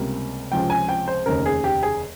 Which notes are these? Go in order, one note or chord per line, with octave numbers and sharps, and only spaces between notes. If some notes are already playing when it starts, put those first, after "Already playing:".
Already playing: C#2 C3 G3 A#3
C#2 C3 F3 C4 G5
G#5
G5
C5
F1 D#2 C#3 A#4
G#4
G4
G#4